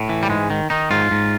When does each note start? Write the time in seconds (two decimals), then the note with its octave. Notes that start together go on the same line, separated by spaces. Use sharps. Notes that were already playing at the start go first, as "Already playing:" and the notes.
Already playing: A2
0.09 E3
0.23 G3
0.30 G#2 G#3
0.50 D#3
0.70 D#3 D#4
0.91 G#2 F4
1.11 G#2